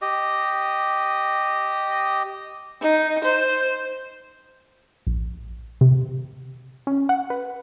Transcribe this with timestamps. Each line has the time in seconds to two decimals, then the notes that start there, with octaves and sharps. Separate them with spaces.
0.02 G4 D#5
2.82 D#4
3.24 C5
5.07 A#1
5.81 C3
6.87 C#4
7.09 F#5
7.30 B4